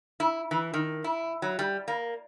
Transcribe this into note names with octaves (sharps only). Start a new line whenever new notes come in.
E4
E3
D#3
E4
F#3
G3
A#3